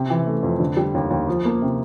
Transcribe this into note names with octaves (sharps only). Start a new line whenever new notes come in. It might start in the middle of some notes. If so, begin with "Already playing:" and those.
Already playing: C3
E3
A3
F2
D3
G3
D#2
D#2
F3
A#3
C3